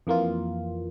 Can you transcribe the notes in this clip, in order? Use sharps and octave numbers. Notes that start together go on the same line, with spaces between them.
F2 E3 A#3 F4